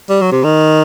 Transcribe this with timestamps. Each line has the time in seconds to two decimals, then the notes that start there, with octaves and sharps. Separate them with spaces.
0.09 G3
0.21 F#3
0.32 C3
0.44 D#3